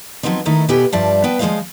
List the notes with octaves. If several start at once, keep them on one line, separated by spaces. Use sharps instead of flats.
F3 F#3 B3 C4 D#4
D#3 A3 D#4 E4 A4
B2 B3 G4 A4 B4 G#5
G2 F3 D5 E5 A5
B3 B4 G5 A5
F3 G#3 A#3 C5 D#5 F5